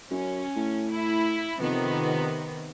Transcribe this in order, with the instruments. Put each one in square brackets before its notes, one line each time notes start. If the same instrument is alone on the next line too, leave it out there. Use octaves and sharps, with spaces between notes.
[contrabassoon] F#2 [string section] C#4
[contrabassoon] A2
[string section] E4
[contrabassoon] F2 [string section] C3 D#3 B3